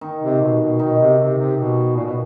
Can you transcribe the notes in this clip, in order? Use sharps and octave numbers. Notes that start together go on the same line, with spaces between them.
D#3 D#4
C3
B2
B2
B2 D#3 D#4
C3
C3
C3
B2
A#2
B2